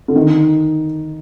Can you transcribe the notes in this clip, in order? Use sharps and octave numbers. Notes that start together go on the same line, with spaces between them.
D3
D#3